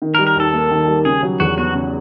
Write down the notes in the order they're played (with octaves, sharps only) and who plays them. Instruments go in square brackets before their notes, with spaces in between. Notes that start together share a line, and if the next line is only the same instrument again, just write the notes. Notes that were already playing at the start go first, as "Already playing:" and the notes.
[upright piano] D#3
[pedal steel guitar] A#4
[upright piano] G3
[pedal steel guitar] A#4
[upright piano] D#2 [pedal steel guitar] A4
[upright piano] A#3
D#3
G3
[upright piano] C#3 [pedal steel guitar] G#4
[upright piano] F#3
[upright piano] E2 [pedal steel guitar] F#4
[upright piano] B3 [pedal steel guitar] F#4
[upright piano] C#3